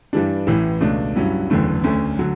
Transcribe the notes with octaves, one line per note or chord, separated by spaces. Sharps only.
G2 E3 G3 D4
A1 A2 E3
C#2 B2 A3 D4
G2 F#3 C#4 E4
F#1 E2 D3 A3
D2 D3 A3 C#4
D3 F#3